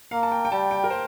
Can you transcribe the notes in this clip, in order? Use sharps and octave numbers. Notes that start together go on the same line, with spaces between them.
A#3 F5
A5
G5
G5
G3 A5
G5
A#4
C5